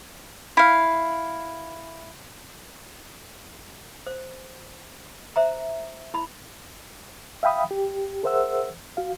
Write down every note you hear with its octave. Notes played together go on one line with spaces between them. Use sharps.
E4 F5
C5
C5 E5 A#5
E4 B5
E5 F5 G5 B5 D#6
G4
G#4 A#4 C5 E5 F#5 E6
F#4 F5